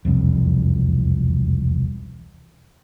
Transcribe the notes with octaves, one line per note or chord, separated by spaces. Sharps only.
E1 C2 F2